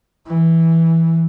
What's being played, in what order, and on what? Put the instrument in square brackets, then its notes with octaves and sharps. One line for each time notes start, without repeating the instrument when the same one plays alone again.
[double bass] E3